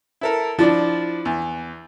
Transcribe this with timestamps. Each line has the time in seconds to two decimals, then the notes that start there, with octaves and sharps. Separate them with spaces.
0.21 E4 A4 A#4
0.59 F3 D4 E4 D5
1.25 E2